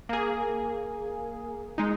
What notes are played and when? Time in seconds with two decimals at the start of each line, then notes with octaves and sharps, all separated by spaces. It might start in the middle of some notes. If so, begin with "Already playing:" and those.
0.09 A#3 G#4
1.78 G#3 D#4